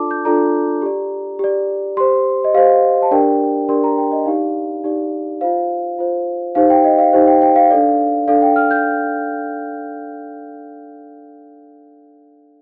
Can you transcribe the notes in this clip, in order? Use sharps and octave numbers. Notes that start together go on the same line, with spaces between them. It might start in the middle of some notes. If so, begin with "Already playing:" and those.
Already playing: D4 F4 A4 D5 A5 D6
G6
D4 F4 A4 D5 A#5
G4 D5
G4 D5
G4 C5 C6
D#5
G4 C5 F5
A5
D4 G4 A#4 D5 G5
D4 G4 A#4 D5 C6
A#5
G5
D#5
D#4 G4 D5 F5
D#4 G4 D5
F4 C5 F5
F4 C5
D#4 G4 C5 F5
G5
D#5
F5
D#4 G4 C5
G5
G5
F5
D4 A4 D5
D4 A4 D5 F5
G5
F6
G6